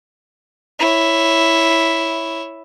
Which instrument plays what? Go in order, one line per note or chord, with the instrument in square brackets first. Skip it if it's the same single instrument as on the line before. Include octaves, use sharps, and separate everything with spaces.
[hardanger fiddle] E4 C#5